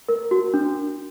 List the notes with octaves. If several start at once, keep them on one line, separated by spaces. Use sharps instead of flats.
A#4
F#4
D4